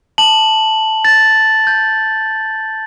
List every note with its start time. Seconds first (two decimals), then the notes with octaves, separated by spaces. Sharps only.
0.18 A5 F#7
1.05 A6
1.67 G6